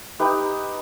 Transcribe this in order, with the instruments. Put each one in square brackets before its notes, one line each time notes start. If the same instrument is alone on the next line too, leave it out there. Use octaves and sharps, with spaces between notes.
[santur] D#4 G4 B4